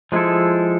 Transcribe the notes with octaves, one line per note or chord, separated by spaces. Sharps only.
F3 G#3 B3 E4 A4